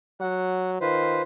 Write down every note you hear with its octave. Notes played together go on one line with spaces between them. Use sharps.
F#3 F#5
D#3 F4 B4 C5